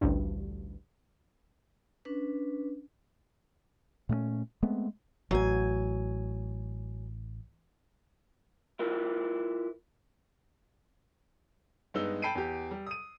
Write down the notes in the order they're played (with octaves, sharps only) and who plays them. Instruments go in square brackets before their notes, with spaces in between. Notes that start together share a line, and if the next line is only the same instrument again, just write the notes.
[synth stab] A1 D2 G2
[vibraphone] C#4 D4 B4
[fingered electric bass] A#2 A3 A#3 C#4
G#3 A3 B3 C4
[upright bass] A1 [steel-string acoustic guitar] F#3 G#5
[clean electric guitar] E4 F4 A#4 B4
[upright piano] G2 G#3 B3 D#4 E6 G7
G5 A5 B5 C7 D7 D#7
E2 G4
G3
D#6 D#7